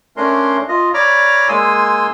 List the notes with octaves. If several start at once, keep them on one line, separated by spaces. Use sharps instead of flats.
A3 C#4 D4 A#4 C6
F4 D#5
C#5 D5 A#5 B5 D6 F6
G#3 A#3 G#5 C6 D#6 E6